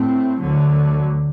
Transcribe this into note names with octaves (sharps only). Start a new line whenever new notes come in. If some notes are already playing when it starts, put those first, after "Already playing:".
Already playing: A2 A3 C4
D2 D3 F#3